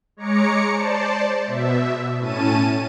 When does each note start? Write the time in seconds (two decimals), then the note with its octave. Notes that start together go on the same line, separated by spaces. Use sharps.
0.17 G#3 C#5 A#5 D6 C#7
0.73 C5 D5 A5
1.46 B2 E5
2.19 A2 C#4 A5 D#7